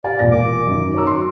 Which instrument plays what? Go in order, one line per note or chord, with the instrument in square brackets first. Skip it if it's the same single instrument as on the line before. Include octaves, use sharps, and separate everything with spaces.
[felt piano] G4 F5 G#5 [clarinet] D5
[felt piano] E1 A#2 A#6
[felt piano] A#4 [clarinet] D6
[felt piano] F#2 D#3
[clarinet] F#4 [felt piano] C#5 A#5 E6
[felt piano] C6